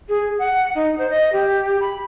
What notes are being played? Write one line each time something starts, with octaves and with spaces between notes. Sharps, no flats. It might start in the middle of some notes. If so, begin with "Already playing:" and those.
G#4
F#5
D#4
C5
D#5
G4
B5